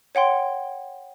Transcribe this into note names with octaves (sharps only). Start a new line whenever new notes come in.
C#5 F#5 G5 C6